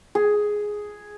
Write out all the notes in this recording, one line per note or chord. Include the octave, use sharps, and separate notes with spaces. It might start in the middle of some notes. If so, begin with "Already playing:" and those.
G#4